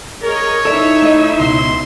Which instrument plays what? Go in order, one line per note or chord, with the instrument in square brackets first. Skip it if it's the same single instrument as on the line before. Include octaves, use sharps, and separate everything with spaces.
[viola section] G#4 A#4 D#5 [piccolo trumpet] C#5
[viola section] D#4 E4 E5 [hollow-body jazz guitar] A4 D5
[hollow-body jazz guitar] A3 D#5
[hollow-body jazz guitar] C#2 B2 [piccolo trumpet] C6